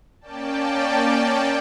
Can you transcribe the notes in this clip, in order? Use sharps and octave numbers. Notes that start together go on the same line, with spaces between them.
A#3 C#4 D5 G5 A5